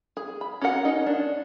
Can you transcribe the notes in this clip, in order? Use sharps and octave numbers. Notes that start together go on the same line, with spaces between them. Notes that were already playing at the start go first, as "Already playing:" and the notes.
G#4
B5
C#4 F#4 G4 A#4 F#5
C#4 D#4 D#5
D4